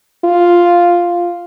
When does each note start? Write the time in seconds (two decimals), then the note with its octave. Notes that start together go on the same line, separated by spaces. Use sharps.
0.24 F4